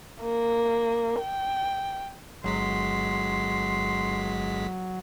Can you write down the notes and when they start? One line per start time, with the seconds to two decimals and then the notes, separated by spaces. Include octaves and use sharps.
0.22 A#3
1.21 G5
2.44 G1 F#3 G#3 C6 B6